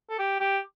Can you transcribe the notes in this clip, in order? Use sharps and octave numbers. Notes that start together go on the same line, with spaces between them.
A4
G4
G4